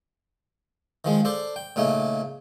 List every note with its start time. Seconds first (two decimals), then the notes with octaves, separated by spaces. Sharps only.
1.05 D#3 F3 G#3
1.25 D4 A4 C5
1.56 G5
1.76 A#2 C#3 A3 D#4